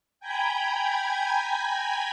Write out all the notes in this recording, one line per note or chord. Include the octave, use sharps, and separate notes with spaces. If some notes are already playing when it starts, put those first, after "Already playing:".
G5 G#5 A#5 B5 G6 G#6